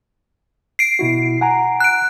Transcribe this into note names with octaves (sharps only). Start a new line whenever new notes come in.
C7 D7
B2 E4 F#4
F#5 G#5 A#5
F#6 D7